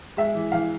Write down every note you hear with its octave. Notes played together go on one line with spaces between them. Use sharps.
G#3 E5
E3
E3 F5